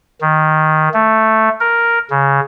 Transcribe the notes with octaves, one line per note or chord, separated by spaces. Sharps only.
D#3
A3
A#4
C#3